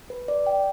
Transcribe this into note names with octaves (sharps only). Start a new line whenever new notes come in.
B4
D5
G5